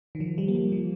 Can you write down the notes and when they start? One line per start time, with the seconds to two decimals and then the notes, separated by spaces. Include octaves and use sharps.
0.15 D#3
0.20 F3
0.38 G3
0.48 A#3
0.55 G3
0.72 F3